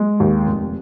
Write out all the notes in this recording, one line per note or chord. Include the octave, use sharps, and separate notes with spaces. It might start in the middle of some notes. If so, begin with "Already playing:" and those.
Already playing: G#3
D#2
F1